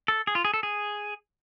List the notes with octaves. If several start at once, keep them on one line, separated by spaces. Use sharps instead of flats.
A4
G#4
F4
G#4
A4
G#4